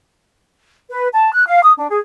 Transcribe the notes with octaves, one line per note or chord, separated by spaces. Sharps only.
B4
A5
F#6
F5
D#6
D4
G#4